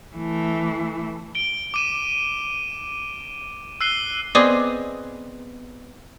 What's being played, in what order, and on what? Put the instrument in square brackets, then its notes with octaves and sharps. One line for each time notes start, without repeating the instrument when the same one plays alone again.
[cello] E3 A3
[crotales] D7 G7
D6 D#7 E7
E6 F#6 C7 D#7 G7
[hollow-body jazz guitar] B3 [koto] C4 G#4 D#5 [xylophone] D5 D6 D#6